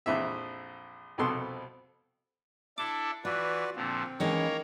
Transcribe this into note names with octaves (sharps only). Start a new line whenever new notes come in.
A#1 F2 E3 E5
C2 F2 B2 B3 A4 C6
D4 E4 A4 D6
E3 F4 F#4 B4 D5
A#2 D3 F3 C4
D#3 E3 G#3 A#3 C#4 A#4 C#5